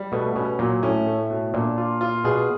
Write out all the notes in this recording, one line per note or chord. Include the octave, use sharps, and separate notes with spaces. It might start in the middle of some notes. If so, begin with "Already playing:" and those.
Already playing: G3
B2 A3
B2 C#4
A#2 F#3
A2 C#4
A3
B2
A#2 D4
F4
F4
B2 G#4